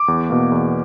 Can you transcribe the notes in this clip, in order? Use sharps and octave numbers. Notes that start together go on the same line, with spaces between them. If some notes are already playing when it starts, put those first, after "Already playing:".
Already playing: D6
E2
B2 A#3
E2